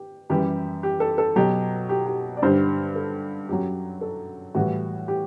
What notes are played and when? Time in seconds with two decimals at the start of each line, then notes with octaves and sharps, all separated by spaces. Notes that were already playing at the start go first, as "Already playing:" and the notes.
Already playing: G4
0.30 F#2 E3 G3 G4
0.83 G4
1.00 A4
1.18 A4
1.36 B2 F#3 G4
1.89 G4
2.06 G4
2.37 D5
2.42 G2 D3 G3 C5
2.95 A4
3.49 F#2 F#3 G4
4.01 A4
4.55 A2 E3 G3 F#4
5.08 G4